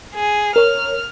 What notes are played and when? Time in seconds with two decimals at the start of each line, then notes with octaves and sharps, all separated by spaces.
0.15 G#4
0.56 A#4 C#5 F6